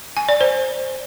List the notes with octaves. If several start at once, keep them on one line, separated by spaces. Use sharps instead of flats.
G#5
D5
C5